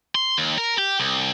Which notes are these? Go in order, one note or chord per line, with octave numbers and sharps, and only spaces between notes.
C6
D#2
A#4
G4
C2